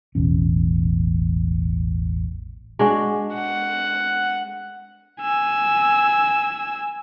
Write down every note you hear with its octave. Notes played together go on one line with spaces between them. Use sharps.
E1 A1 C#4
G#3 D4 F#4
F#5
G#5 E6